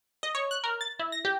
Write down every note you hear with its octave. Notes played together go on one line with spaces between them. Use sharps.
D#5
C#5
F#6
A#4
A6
E4
A#6
G4